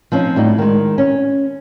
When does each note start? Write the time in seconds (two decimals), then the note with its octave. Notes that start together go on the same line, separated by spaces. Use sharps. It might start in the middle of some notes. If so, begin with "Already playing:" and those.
0.12 F3 C4 C#4 D#4
0.36 A2 G3 D#4
0.58 D#3 G#3
0.98 C#4